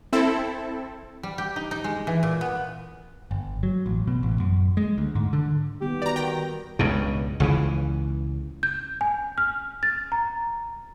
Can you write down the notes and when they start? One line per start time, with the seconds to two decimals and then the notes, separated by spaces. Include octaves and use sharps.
0.13 C4 E4 A4
1.23 G3
1.38 G4
1.56 D#4
1.71 D#4
1.84 G#3
2.07 E3
2.23 A#2
2.41 B3
3.31 G1
3.63 F#3
3.86 A1
4.07 B2
4.23 A1
4.40 F#2
4.77 G#3
4.98 D2
5.15 G#2
5.33 D3
5.81 D#3 G3 B3 G4
6.02 F#4 B4 D5 A#5
6.16 D#3 G5 A#6
6.79 C#2 G2 B2
7.40 C#2 C#3 E3
8.63 G6
9.01 G#5
9.38 F6
9.83 A6
10.12 A#5